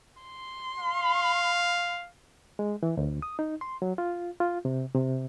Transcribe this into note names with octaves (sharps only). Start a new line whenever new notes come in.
C6
F5
G#3
E3
D2
D#6
D#4
C6
F#3
F4
F4
C3
C3